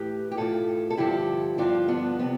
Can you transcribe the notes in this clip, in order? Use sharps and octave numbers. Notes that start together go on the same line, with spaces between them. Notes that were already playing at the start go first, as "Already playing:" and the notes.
Already playing: A2 E3 G4 B4
G4
A2 E3 F4 A4
A4
G2 D3 F3 E4 G4
G2 D3 F3 D4 F4
B3 D4
C3 F3 B3